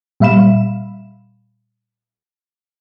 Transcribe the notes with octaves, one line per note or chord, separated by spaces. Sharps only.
A#2 G3 E5 F5 B5 E7